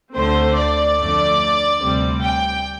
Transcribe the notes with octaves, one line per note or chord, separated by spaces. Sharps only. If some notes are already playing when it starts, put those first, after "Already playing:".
D2 D3 A3 C4 C5
D5
F2 D3 A3
D2 C3 G3 C4
G5